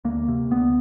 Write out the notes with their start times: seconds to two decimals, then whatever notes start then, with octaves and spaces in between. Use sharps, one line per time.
0.05 D2 A#3
0.28 C3
0.51 D2 B3